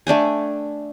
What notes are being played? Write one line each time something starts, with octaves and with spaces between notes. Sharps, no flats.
A3 D4 G5 G#5